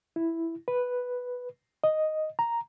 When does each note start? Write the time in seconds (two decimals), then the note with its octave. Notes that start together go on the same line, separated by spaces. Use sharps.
0.16 E4
0.68 B4
1.84 D#5
2.39 A#5